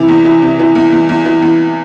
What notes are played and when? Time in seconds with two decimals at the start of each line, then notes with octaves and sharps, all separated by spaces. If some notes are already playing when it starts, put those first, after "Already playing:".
Already playing: C3 E3
0.08 E2
0.25 E3
0.42 C3
0.59 E3
0.75 E2
0.92 E2
1.09 E2
1.25 E3
1.42 E2